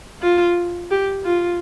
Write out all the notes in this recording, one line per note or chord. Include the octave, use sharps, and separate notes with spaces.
F4
G4
F4